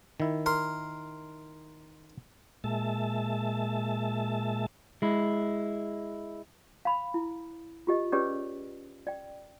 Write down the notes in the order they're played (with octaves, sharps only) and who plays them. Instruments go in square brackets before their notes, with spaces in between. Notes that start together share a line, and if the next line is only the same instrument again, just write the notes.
[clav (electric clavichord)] D#3 E4
[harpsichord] A#4 C6
[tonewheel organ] A#2 G#3 E5 A5
[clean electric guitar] G#3 E4
[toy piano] F5 B5
E4
F4 G4 D#5
C#4 G4 G#4 B4 C#5 D5
D5 G5